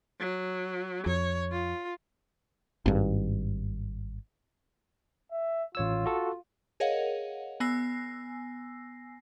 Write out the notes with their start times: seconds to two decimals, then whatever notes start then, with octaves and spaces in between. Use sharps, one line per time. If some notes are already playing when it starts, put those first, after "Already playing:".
0.20 F#3
1.06 F2 C#5
1.51 F4
2.86 G#1 G2
5.31 E5
5.75 A1 F4 C#5 E6
6.06 F#4 A4
6.80 G#4 A#4 C#5 D#5 F5 F#5
7.60 B3 G#5 E6 A#6 C7